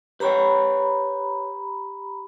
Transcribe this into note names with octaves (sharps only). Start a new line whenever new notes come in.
G4 B4 C#5 G5 A#5 B5